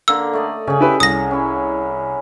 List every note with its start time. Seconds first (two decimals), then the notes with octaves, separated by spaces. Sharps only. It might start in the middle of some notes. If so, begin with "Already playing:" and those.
0.08 D3 A#3 E6
0.33 A3 D5 D#5
0.67 C#3 C#4 G#4
0.81 E4 G4 B4
1.00 C2 D#6 A#6
1.31 C#4 E4